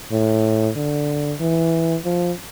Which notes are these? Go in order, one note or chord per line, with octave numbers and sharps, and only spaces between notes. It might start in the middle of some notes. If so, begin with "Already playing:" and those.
A2
D3
E3
F3